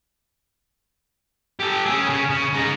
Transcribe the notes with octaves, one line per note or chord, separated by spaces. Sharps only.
G4 A4
C#4 G#4
C#3
C#3
G#3 D#4